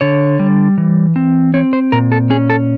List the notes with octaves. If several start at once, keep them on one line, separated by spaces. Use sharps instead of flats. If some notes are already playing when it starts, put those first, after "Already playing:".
D3 C#5
G3
E3
C4
C4 C#5
C5
A#2 A#4
A4
C#4 G#4
A4